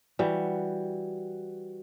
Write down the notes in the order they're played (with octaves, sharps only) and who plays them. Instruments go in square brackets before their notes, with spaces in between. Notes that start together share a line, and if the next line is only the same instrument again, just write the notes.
[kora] E3 G3 [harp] F#4